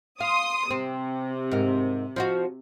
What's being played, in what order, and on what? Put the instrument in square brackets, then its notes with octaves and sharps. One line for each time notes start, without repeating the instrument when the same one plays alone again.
[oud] F5 [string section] C6 D#6
[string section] C3 [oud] C4
[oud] G#2 A#4
F3 D#4 F#4